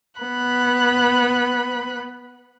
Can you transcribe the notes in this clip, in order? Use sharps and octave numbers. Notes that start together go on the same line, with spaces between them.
B3 B5 F#6